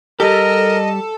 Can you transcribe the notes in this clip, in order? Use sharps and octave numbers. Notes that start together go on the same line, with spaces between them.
G3 G4 A4 A#4 D#5